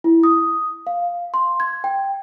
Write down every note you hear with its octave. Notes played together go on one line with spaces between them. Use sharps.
E4
D#6
F5
C6
G#6
G5